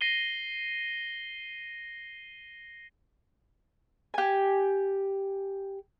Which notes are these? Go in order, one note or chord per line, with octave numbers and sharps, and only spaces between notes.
A#6 C7 D#7 G7
G4 G#5